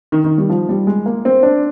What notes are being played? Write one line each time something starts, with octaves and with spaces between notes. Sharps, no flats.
D#3
D#3
G3
F3
G3
G#3
A#3
C4
D4